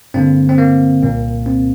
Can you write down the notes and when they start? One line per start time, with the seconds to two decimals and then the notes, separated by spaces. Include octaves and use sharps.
0.14 G2 D3 A#3 C4
0.49 C4
0.58 A#3
1.02 C2 A#2 A#3
1.46 C4